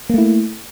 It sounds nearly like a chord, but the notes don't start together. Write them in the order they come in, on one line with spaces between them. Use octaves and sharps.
A#3 A3 E4